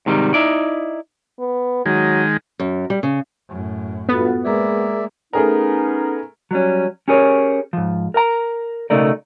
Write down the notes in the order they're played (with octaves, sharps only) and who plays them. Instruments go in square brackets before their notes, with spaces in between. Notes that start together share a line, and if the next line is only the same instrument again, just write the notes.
[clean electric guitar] G#2 C3 D#3 G3
D#4 E4 D5
[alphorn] B3
[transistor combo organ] D#3 G#3 [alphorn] F#3
[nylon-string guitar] F#2
G3
C#3
[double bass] F#2 A2
[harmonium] G2 [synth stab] B3 [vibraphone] F4 F#4 A4
[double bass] G#3 A#3 [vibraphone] G#4 A#4 A#5 [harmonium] D5 E5
[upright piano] A3 G#4 A#4 [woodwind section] B3 C#4 D#4
[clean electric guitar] F#3 G3 C#4
C#4 G4 G#4 A#4 C#5
G#2 F3
A#4 A#5
B1 C#3 A3 D#4 A#4 D5